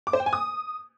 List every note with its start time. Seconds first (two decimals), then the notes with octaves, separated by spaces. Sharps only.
0.07 D6
0.13 C5
0.20 G5
0.26 G#5
0.33 D#6